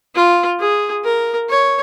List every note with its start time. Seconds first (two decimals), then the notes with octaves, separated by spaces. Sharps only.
0.15 F4
0.60 G#4
1.04 A#4
1.49 C#5